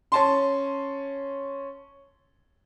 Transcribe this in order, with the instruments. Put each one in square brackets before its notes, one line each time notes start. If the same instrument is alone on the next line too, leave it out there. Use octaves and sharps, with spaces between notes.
[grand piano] C#4 A5 C6